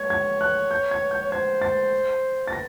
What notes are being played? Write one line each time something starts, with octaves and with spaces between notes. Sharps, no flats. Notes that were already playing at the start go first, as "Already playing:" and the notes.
Already playing: C#5 G#6
G#6
F#6
G6
G#6
G6
C#5
C5 G#6
A6
A6
A#6